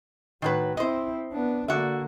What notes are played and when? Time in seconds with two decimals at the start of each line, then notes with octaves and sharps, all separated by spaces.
0.42 A2 D#3 F#3 B4
0.77 C4 E4 C5 D#5
1.32 B3 D4
1.68 D3 A#3 F#4 D5 E5